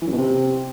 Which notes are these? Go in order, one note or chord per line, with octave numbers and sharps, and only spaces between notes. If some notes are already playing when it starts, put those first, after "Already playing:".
E3
F#2
B2
C3